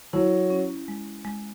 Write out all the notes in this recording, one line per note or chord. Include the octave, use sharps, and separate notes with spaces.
F#3 E4
C#4
G#3
G#3